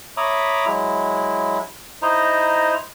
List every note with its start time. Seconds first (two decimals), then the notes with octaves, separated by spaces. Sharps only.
0.17 C#5 E5 A#5 B5 D6 D#6
0.66 F#3 G#3 E4
2.02 D#4 E4 C5 D#5 A#5